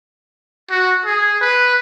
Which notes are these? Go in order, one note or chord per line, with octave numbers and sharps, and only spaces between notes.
F#4
G#4
B4